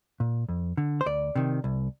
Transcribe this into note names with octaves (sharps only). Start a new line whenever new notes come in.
A#2
F2
D3
C5
D2 D5
C3 D#3
C2